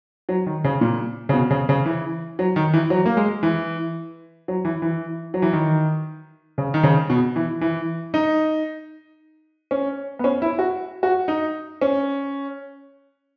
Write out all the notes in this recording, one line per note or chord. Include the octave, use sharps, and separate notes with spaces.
F#3
D#3
C#3
A#2
C#3
B2
C#3
C#3
E3
F#3
D#3
E3
F#3
A#3
G#3
E3
F#3
E3
E3
F#3
E3
D#3
C#3
D#3
C#3
B2
E3
E3
D#4
C#4
B3
C#4
E4
F#4
F#4
D#4
C#4